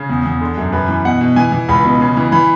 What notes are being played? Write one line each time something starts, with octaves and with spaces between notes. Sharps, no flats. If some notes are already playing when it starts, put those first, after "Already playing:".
Already playing: C#3
E2
E2
D3
F#2
F#2 B4
E3
B2 F#5
B2
E3 G#5
E3
C#2 B5
B2
C#3
E3
E3 B5